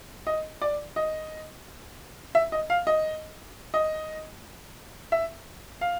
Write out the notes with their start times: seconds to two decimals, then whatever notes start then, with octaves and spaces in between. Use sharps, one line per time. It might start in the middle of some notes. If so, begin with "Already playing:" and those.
0.27 D#5
0.62 D5
0.96 D#5
2.35 E5
2.52 D#5
2.70 F5
2.87 D#5
3.74 D#5
5.12 E5
5.81 F5